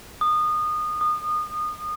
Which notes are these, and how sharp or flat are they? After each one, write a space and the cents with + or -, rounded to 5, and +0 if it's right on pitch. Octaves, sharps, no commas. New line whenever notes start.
D#6 -25
D#6 -30